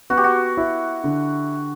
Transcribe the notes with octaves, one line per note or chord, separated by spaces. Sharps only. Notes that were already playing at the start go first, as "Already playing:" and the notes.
B3 F#4
G4
F#4
E4
D3